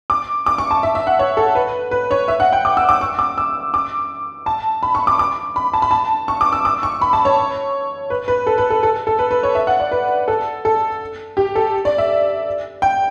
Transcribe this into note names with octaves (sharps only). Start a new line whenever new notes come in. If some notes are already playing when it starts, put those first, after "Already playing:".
D6
D6
C#6
A5
E5
E5
F#5
C#5
A4
B4
B4
C#5
E5
F#5
G5
D6
E6
D6
C#6
D6
E6
D6
A5
B5
C#6
D6
D6
B5
A5
B5
A5
C#6
D6
E6
D6
C#6
B5
A5
C#5
B4
B4
A4
B4
A4
A4
A4
B4
B4
C#5
E5
F#5
D5
B4
A4
A4
G4
A4
D5
E5
G5